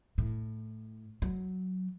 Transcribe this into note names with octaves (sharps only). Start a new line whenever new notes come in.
A2
F#3